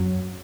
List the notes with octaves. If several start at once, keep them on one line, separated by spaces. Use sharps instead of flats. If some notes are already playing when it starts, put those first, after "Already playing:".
Already playing: F#2 F#3